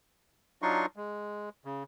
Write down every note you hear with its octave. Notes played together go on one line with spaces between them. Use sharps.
F#3 D4 D#4 F4 C6 C#6
G#3
C#3